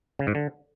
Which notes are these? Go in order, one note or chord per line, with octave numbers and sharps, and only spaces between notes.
C#3
G#2
D3